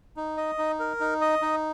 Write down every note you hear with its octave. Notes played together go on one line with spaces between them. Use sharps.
D#4
D#5
D#4
A#4
D#4
D#5
D#4